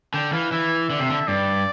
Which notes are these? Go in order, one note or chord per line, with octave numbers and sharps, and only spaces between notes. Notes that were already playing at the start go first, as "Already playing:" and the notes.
D3 G5
E3 F5
E3 E5
D3
C3
D3
G2 D5